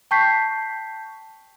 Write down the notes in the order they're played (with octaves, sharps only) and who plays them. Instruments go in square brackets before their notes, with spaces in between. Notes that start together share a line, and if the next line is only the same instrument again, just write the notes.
[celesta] G5 A5 C#6 G6 B6 C7